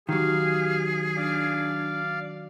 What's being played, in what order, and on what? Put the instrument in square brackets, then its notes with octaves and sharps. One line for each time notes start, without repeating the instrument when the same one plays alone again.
[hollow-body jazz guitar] D#3 F#3 [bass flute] G4 [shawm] G#4 [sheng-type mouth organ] F5
[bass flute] D4 [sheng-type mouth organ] D5 F5